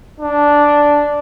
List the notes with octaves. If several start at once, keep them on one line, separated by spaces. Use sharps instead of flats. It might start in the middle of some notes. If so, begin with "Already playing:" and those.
D4